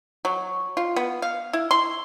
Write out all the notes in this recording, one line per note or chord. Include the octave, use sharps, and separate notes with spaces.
F#3
F4
B3
F5
E4
C6